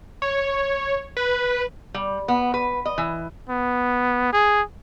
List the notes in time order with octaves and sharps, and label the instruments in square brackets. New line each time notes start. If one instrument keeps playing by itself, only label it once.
[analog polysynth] C#5
B4
[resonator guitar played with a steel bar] G3
B3
B4
D#5
E3
[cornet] B3
G#4